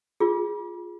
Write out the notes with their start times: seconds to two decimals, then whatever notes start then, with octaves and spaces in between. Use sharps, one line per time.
0.20 F4 G#4